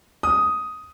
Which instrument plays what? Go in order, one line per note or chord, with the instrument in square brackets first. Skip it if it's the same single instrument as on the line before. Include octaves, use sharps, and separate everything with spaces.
[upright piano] D#6